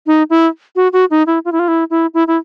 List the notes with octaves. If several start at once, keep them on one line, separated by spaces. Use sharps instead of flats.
D#4
E4
F#4
F#4
D#4
E4
F4
E4
F4
E4
E4
E4
E4